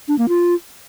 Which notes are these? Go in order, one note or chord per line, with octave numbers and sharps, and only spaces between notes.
D4
A#3
F4